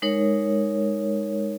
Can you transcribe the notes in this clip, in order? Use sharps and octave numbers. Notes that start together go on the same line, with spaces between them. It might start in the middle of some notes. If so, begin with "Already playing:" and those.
G#3 D#4 A#4 C#5